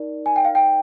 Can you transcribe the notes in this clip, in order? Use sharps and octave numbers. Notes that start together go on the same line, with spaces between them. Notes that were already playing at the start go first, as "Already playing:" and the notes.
Already playing: D#4 A#4 D5
G#5
G5
F5
G5